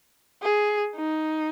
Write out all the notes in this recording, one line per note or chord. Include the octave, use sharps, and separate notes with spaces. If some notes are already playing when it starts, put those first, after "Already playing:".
G#4
D#4